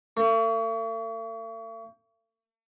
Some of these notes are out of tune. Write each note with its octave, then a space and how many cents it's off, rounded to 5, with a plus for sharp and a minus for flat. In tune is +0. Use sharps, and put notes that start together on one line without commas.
A3 +45